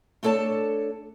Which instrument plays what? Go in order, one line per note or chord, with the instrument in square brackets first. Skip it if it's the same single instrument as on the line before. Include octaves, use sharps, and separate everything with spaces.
[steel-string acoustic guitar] A3 D4 A4 C#5 A5